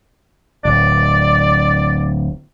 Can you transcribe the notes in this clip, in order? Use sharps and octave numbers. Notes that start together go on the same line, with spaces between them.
D1 D5